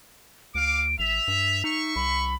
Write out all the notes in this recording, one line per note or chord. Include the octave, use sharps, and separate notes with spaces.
D2 F5 D6 D7
A1 E5 F7
G2
D#4 E5 C#6
C2 B5